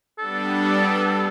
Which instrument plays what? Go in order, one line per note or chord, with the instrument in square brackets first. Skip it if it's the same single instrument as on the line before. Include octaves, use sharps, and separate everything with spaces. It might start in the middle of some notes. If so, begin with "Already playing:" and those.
[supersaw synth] G3 B3 D4 [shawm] A4